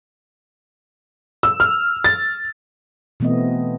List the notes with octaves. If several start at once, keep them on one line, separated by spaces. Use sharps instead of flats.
E6
F6
A6
B2 E3 A3 B3 C4 D#5